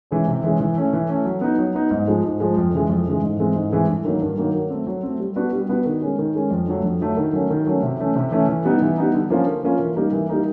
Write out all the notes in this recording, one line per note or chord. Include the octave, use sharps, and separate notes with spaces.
E3 G#3 C#4
C3
E3 G#3 C#4
E3
A3 C#4
E3
A3 C#4
F#3
B3 D#4
F#3
B3 D#4
G#2
F3 G#3
G#2
F3 G#3
F2
C#3 E3 G#3
F2
C#3 E3 G#3
G#2
E3 G#3 C4
G#2
E3 G#3 C4
G2
D#3 F#3 A#3
G2
D#3 F#3 A#3
F#3
A3 C4
F#3
A3 C4
G3
B3 D4 F#4 B4
G3
B3 D4 F#4 B4
D#3
G#3 C#4
D#3
G#3 C#4
F2
D3 F#3 A3
F2
D3 F#3 A3
D#3
F#3 A3 C#4
D#3
F#3 A3 C#4
C3
E3 A3 C#4
C3
E3 A3 C#4
E3
G3 B3 D#4
E3
G3 B3 D#4
D3
F3 A#3 C#4 F4
D3
F3 A#3 C#4 F4
E3
G3 A#3 D#4
E3
G3 A#3 D#4